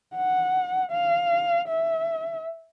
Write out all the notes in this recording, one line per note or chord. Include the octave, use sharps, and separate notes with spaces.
F#5
F5
E5